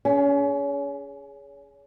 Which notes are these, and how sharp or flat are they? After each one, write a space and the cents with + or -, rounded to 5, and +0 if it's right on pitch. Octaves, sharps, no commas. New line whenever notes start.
C#4 +30 G#4 +0